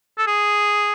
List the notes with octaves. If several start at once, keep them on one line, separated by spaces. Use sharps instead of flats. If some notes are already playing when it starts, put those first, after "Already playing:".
A4
G#4